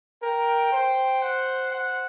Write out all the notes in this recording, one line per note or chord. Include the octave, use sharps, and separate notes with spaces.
A#4 G5
C5
F#5
F#5